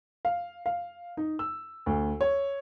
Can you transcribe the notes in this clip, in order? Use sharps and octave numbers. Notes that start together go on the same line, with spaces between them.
F5
F5
D#4
E6
D2
C#5